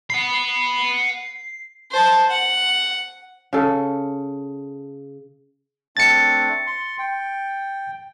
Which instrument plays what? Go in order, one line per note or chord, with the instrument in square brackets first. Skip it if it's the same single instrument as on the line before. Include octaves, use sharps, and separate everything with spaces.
[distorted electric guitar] F#5 B5 [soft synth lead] C7
[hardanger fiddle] C5 A5
F#5
[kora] C#3 A4
[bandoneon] A3 C4 D4 [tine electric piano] A6 C#7
[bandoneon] C6
G5